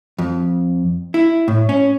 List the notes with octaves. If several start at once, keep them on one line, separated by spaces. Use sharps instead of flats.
F2
E4
A2
C#4